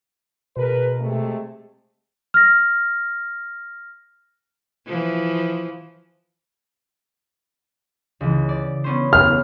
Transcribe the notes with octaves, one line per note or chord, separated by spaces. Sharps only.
B2 G#4 A#4 B4
C3 G#3 A3
F6 A#6
E3 F3
C#2 E3
D5
B3 C#4 C5
F#1 F6 G6 C7